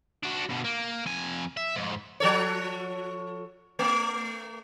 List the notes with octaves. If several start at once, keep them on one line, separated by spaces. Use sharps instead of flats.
D4 F#4
G2 B2
A#3
F2 G#5
E5
F2 G#2
F3 A4 C#5
A3